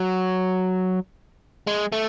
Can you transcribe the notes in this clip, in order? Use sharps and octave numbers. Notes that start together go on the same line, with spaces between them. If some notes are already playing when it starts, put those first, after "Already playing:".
Already playing: F#3
G#3
A3